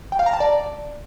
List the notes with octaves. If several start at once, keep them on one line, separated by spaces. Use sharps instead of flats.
G5
F5
A#5
A5
D5